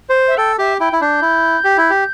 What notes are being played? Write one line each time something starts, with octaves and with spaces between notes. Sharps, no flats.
C5
E5
A4 G5
G4 E5
E4 G5
E4
D4 G6
E4
G4
E4
G4